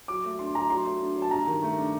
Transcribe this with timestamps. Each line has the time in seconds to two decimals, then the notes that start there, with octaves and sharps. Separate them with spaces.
0.08 F#3 D6
0.25 A3
0.39 D4 C6
0.55 F#3 A#5
0.70 F#3 C6
0.86 A3
1.02 D4
1.16 F#3
1.22 A5
1.31 G2 A#5
1.47 D#3
1.62 A3
1.77 D4